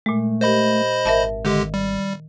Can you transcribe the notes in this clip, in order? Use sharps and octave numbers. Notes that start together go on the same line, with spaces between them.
A#2 G#3 A3
G4 A#4 C5 D#5 B5
G#1 A#4 E5 A5
D3 D#3 G#3 G4
G3